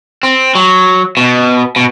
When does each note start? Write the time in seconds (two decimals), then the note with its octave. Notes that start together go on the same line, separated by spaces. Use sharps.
0.23 C4
0.55 F#3
1.17 B2
1.76 B2